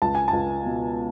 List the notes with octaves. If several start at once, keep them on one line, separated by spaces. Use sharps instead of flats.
C#2 A5
G#5
C#2 A5
B2